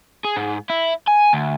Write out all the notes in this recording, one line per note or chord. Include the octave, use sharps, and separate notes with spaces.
G#4
G#2
E4
G#5
D2